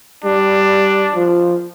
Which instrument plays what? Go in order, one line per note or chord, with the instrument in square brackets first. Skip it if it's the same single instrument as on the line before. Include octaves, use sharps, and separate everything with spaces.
[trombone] G3 [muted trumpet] D4
[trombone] F3